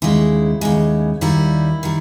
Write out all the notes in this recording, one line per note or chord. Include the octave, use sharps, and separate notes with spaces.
D#2 C#3 G#3 E4
D#2 C#3 G#3
D#2 D#3 G3 E4
D#3 G3